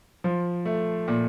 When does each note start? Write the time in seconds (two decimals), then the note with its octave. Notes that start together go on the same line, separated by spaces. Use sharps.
0.24 F3
0.65 A3
1.08 A#2